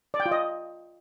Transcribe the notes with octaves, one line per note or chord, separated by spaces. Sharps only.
D5
G5
F4
D#5